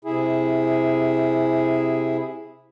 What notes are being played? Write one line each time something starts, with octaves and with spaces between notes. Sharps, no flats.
C3 E4 G#4